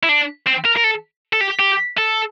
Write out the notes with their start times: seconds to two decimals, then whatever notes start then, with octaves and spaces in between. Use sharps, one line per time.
0.03 E4
0.09 D4
0.46 C4
0.65 A#4
0.76 A#4
0.84 A4
1.33 A4
1.41 G4
1.59 G4
1.98 A4